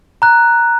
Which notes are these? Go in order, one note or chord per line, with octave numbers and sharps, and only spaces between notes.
A#5 F#6